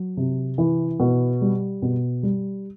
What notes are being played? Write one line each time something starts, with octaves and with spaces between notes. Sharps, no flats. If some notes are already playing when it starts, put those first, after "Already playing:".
Already playing: F#3
C3
E3
B2
G3
B2
G3